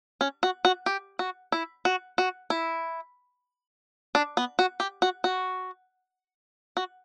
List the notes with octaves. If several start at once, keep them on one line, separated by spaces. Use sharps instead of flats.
C#4
F#4
F#4
G4
F#4
E4
F#4
F#4
E4
D4
B3
F#4
G4
F#4
F#4
F#4